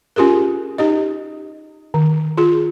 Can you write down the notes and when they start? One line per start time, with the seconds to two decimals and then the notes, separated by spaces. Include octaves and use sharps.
0.16 C#4 F4 G4 G#4 A#4
0.78 D#4 G4 D#5
1.94 D#3
2.37 F4 G#4